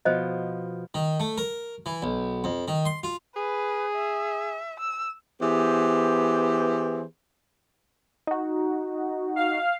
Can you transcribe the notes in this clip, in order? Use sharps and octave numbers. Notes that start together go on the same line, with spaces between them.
B2 F3 C5 D#5
D#3
A3
A#4
E3
B1
F2
D#3
C6
F4
G#4 B4
E5
E6
E3 B3 G4 G#4 C5
D#4 F#4
F5